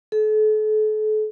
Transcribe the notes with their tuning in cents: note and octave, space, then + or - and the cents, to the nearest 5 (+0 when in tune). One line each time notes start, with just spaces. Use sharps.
A4 -40